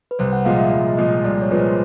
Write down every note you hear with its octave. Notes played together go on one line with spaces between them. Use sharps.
B4
C2 C5
F#5
A#2 F3 G#3 F5
E5
C2 D#5
A#2 F3 G#3 D#5
C2 D5
C#5
A#2 F3 G#3 B4
C5